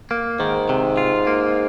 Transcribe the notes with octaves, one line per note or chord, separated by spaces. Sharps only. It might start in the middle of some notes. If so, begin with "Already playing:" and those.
A#3
G#2 D#3
C3
F4
A#3